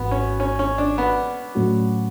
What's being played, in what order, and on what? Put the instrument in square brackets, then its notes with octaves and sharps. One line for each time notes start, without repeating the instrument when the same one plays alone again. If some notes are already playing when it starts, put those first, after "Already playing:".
Already playing: [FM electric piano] G#1 G#2 E3 F#4 [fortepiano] B3
[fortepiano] C#4
C#4
C#4
D4
B3
[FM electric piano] A2 F#3 A3 C#4 F#4